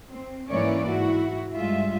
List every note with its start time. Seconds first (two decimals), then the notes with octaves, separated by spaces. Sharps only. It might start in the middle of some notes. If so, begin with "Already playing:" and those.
0.11 C4
0.49 G#2 E3 A#3 C#4 C#5 D5
0.86 G#2 E4 F#4
1.54 G2 G3 G#3 F4 E5